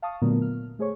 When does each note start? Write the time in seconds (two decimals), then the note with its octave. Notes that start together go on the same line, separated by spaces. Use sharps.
0.02 F5 A5 C#6 D#6
0.22 A#2 D3 F#3 A3 B3 A#4
0.42 F6
0.79 A3 G#4 C5 C#5 C#6